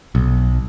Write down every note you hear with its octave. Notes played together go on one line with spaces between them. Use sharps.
B1